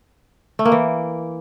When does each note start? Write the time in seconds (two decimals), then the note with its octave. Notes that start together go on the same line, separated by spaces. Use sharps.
0.59 A3
0.65 A#3
0.72 E3